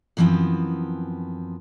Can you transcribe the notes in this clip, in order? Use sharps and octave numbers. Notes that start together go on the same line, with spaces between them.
F#2 E3 F3 B3 C4